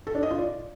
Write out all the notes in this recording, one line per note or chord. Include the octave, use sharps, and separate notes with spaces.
A4
D4
D#5
F4
D5